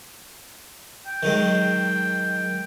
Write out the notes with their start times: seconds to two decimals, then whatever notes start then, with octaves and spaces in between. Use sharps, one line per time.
1.07 G5
1.23 D#3 F#3 G#3